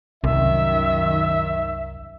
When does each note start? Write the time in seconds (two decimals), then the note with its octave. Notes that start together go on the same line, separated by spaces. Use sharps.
0.24 C2 F#2 D#3 E5